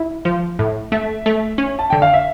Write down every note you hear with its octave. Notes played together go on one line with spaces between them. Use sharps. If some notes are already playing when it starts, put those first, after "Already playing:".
Already playing: E4
F3
A2
A3 E5
A3
C#4
A5
D3 G5
F5
E5